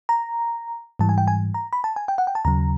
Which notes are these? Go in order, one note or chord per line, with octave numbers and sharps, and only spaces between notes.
A#5
G#2 E3 G3 A5
G#5
G5
G#5
A#5
B5
A5
G#5
G5
F#5
G5
A5
D#2 C#3 F#3 A#5